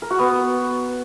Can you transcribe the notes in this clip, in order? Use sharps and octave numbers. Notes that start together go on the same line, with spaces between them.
A#4
F#4
B3